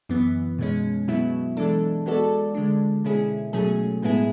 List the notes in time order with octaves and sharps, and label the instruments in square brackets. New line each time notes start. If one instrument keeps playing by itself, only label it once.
[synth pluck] F#2 E3 B3
B2 G#3 C#4
B2 F#3 B3 E4
E3 G#3 D4 A4
G#3 B3 F#4 A4 D5
D3 G#3 D4
B2 G#3 C#4 E4 G#4
B2 F#3 A3 C#4 G#4
A2 G#3 B3 E4 G#4